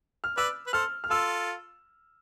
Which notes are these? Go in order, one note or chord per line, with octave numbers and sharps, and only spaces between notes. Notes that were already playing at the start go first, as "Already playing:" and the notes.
F6
B4 D5 E6
B4
A4 C5 F6
F6
F4 A4 E6